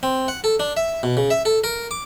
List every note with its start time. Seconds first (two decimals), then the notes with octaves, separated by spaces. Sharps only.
0.03 C4
0.28 F#5
0.44 A4
0.60 D4
0.77 E5
1.03 B2
1.17 C#3
1.31 E5
1.45 A4
1.64 A#4
1.91 D6